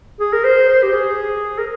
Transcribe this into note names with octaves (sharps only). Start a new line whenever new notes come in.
G#4
A#4
C5
C5
G4
G#4
A#4